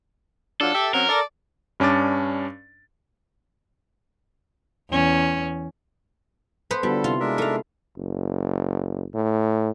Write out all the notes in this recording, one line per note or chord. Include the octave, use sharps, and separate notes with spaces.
F#3 D4 F4 A4
G4 E5
F#3 C4 C#4 A#4
A4 D5
G2 C#4 D4 D6 A6
E2 C#4
B3 A4 B4 C5
D3 G3 B3 F4 F#4 A4
C3 E4 F4
G#3 D4 A#4 E5
A3 D#4 A4 F5
F#1
A2